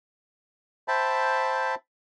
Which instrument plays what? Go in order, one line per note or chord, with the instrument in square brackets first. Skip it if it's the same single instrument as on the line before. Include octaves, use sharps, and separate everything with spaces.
[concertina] C5 E5 G5 A5 B5